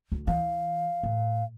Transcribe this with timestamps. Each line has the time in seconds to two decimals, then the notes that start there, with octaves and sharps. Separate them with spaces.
0.12 D2
0.27 E3 F5
1.03 A2